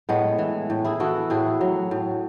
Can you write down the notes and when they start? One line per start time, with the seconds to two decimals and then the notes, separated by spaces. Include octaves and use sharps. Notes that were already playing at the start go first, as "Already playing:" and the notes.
0.09 A2 G#3 B3
0.38 E3
0.70 A2
0.84 E4 G#4
1.00 E3 F#4 A4
1.30 A2 E4 G#4
1.61 F#3
1.91 A2